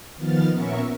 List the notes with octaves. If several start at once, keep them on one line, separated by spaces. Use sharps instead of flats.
D#3 F3 B3 F6 A6
A#2 B3 C#4 A#4 E5 C#6